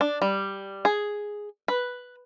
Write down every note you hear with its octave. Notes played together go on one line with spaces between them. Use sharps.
D4
G3
G#4
B4